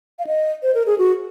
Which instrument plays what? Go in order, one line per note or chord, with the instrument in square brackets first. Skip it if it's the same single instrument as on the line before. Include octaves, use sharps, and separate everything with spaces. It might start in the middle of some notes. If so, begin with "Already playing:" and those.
[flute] F5
D#5
C5
A#4
G#4
F#4